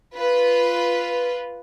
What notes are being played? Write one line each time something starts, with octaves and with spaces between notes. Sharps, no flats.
F4 B4